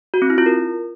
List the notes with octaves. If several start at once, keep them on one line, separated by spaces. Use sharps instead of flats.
F#4
C4
E4
F4
A#4